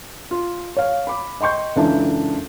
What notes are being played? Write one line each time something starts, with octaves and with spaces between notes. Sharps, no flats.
F4
C#5 F5
B5 D6
D#5 G5 C6 C#6 G6
C#2 F#2 E3 D4 A4 E5